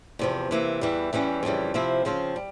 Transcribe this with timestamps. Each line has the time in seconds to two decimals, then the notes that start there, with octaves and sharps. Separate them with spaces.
0.19 E2 C3 F3
0.51 C3 E3 A#3
0.81 E2 E3 G3
1.13 E2 E3 G3 C#4
1.43 F2 C#3 E3 G3
1.74 C3 F3 C4 E4
2.05 C#3 F3 C4 F4
2.36 G3